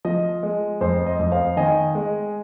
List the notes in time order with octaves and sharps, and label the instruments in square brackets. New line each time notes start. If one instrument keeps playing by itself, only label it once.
[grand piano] F3 D#5
G#3
F2 C5
D#5
F2
C5 F5
D#3 D#5 G#5
G#3